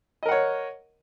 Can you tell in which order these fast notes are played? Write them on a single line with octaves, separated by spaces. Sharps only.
D#5 A#4 F#5 C#5